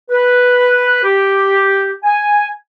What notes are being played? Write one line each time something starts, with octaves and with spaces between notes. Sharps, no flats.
B4
G4
G#5